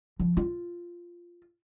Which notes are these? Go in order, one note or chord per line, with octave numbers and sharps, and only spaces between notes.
F3
F4